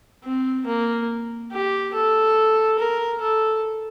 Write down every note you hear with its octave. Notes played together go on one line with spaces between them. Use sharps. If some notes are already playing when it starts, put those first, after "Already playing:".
C4
A#3
G4
A4
A#4
A4